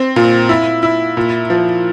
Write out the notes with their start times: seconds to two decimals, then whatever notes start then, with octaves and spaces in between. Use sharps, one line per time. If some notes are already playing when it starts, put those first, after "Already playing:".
Already playing: C4
0.16 A#2
0.49 E4
0.83 E4
1.17 A#2
1.50 F3